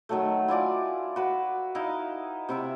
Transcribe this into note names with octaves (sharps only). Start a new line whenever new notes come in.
D#3 F#3 A3
E4 F4 D5 G#5
F#4 B4
D#4 E4 D#5 F5
C3 E4 E5